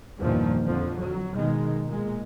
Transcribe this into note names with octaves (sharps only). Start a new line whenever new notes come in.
E2 G2 A#2 D#3 F3
F2 D3 F3
F#3
B2 D#3 G#3
A#2 G#3